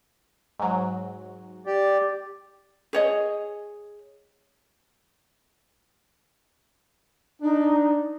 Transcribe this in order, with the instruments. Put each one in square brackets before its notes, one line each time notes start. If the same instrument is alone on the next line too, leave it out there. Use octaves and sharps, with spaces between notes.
[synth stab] G#2 F#3
[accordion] G4 D5
[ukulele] G#4 C#5 D#5
[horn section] D4 [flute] D#4